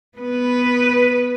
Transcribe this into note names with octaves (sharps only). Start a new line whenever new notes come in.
B3 B4